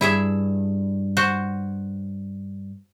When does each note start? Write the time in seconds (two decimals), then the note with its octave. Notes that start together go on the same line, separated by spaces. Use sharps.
0.01 G2 E4 G#4 E5
1.17 F#4 C5